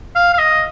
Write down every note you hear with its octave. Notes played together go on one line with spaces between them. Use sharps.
F5
F5
D#5